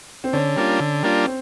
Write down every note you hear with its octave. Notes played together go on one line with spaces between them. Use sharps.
C4
D3 C#4
G3 A#3 D4 F4
D3
G3 A#3 D4 F4
C4